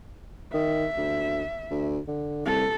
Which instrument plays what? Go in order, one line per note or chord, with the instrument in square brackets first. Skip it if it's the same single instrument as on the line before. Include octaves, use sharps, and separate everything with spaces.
[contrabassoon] D#3 [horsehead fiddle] E5
[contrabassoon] D2
D2
D3
[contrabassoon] C2 [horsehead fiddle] A4